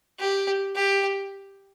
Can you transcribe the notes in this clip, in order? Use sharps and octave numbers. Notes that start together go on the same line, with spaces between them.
G4
G4